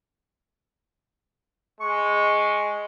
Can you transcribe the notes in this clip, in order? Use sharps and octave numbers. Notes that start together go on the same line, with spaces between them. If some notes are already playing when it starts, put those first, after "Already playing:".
G#3 C#6